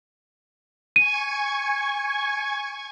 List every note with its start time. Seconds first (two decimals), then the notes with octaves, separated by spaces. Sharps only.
0.96 G#5 C#6 G#6 D#7